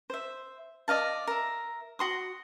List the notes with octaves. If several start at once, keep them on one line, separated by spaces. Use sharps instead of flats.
C5 E5
D5 D#5 F5 A5
A#4 E5
F#4 C6 D#6